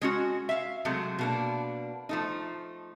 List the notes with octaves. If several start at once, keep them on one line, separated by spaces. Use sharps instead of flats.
G#3 C#4 F#4
E5 F5
C3 F#3 G#3 A3
B2 A#3 D4
F3 A3 D#4